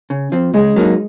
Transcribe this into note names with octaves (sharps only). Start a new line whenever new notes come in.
C#3
F3 C4
C#3 G#3
F#3 A#3 D#4